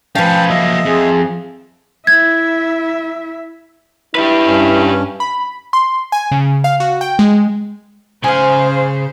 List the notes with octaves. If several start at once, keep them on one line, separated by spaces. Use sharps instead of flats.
F3 C#4 B4 F5 G5 A5
F#3 A#3 D#5 E5
F2 G#4
E4 E5 G#6
E4 G4 B4
G2 C#4
B5
C6
G#5
C#3
F5
F#4
G5
G#3
C#3 G#4 C5 F5 G#5